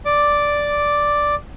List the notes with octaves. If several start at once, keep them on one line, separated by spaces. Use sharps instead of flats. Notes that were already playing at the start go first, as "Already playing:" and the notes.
D5 D6